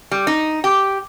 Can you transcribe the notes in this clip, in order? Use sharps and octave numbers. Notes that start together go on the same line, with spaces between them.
G3
D#4
G4